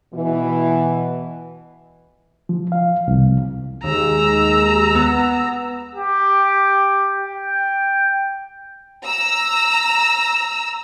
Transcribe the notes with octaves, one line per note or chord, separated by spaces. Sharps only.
B2 E3
F3
F5
C2
D#2 G#3 A#5 E6
B3
G4
G5
A#5 E6